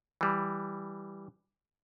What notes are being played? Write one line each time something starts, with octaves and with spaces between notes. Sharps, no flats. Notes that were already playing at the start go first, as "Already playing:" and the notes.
E3 G3